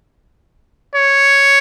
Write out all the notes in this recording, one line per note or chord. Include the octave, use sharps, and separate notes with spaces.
C#5